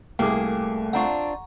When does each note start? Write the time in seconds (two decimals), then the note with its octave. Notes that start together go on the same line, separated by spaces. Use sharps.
0.19 C2 A3 A#3 G#4 G5 D6
0.93 C4 D4 F4 F#5 A#5 C#6